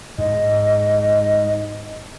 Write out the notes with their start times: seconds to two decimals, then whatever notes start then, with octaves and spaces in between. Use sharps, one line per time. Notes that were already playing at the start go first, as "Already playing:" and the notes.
0.18 G#2 D#5